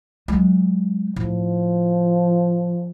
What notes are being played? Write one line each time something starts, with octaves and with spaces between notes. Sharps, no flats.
F#3 G#3
A2 F3